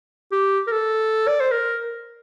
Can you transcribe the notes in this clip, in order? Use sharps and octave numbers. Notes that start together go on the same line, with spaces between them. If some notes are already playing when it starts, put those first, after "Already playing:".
G4
A#4
A4
D5
C5
A#4